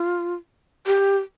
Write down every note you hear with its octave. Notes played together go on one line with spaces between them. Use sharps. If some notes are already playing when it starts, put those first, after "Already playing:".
Already playing: F4
G4